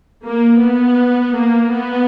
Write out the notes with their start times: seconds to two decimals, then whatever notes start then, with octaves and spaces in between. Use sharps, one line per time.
0.24 A#3
0.61 B3
1.35 A#3
1.72 B3